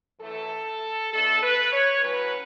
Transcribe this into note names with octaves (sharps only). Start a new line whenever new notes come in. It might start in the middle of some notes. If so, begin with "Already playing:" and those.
F#2 E3 A3 A4
B2 A3 D4 A4
B4
C#5
A2 F#3 C#4 B4